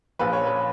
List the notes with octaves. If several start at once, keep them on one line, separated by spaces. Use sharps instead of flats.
A#1 A#2 F3 B4
C#5
B4